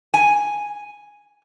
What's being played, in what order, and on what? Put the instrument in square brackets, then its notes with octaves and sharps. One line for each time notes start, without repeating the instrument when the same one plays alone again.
[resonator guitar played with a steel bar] G#5